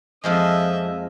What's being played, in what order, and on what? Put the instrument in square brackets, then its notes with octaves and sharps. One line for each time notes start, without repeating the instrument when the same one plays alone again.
[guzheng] F2 F3 G#3 [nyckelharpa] D#5 E5